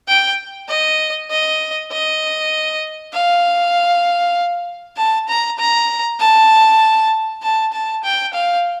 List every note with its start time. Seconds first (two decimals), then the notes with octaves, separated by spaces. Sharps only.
0.08 G5
0.69 D#5
1.31 D#5
1.92 D#5
3.13 F5
4.97 A5
5.29 A#5
5.58 A#5
6.19 A5
7.43 A5
7.73 A5
8.04 G5
8.34 F5